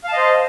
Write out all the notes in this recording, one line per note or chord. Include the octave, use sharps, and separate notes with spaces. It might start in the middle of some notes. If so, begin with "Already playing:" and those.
C5 D#5 F5 A5